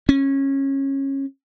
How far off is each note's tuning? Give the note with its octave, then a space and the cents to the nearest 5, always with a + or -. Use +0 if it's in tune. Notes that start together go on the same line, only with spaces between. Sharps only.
C#4 -20